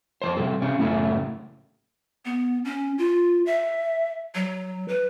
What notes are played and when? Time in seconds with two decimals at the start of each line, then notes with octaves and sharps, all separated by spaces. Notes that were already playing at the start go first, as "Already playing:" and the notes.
0.22 F2 E3 C5
0.37 C3 G3 A4
0.62 C3 C#4
0.79 F#2 A2 C#3 A3
2.25 B3
2.65 C#4
2.98 F4
3.46 E5
4.35 F#3
4.88 B4